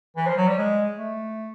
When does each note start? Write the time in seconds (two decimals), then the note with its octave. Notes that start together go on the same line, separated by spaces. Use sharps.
0.17 E3
0.27 F3
0.37 F#3
0.47 G3
0.58 G#3
0.97 A3